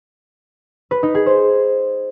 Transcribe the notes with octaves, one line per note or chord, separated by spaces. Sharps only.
B4
D#4
G#4
C5